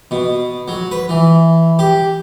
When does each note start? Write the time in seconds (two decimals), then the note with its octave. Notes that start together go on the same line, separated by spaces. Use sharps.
0.11 B2
0.68 F#3
0.91 B4
1.09 E3
1.79 G4